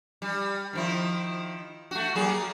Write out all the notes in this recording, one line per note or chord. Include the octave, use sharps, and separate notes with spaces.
G3
D#3 F3 E4
A3 F#4
F#3 A#3 G#4